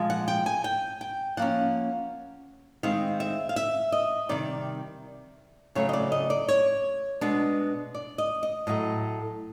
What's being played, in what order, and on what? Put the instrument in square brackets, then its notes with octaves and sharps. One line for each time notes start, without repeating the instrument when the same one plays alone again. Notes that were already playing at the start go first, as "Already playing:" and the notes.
Already playing: [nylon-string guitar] A#2 F3 G#3
F#5
G5
G#5
G5
G5
F3 A#3 C#4 F#5
D#3 G#3 C4 F5
E5
F5
E5
D#5
C3 D#3 G3 D5
C#3 F#3 A3 C4 C#5
D#5
D5
D#5
D5
C#5
B2 G#3 B3 D4
D5
D#5
D#5
A2 F#3 A3 D#5